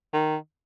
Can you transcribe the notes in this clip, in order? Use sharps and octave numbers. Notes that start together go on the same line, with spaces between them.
D#3